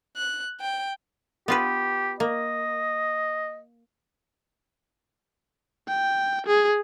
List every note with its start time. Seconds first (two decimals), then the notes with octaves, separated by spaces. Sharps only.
0.17 F#6
0.61 G5
1.48 B3 F4 G4 B4
2.20 A#3 D#5
5.88 G5
6.47 G#4